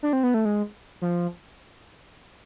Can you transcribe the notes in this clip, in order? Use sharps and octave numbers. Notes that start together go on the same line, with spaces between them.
D4
C4
B3
A3
G#3
F3